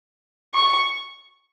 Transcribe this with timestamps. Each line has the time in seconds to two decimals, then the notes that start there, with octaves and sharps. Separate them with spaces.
0.54 C#6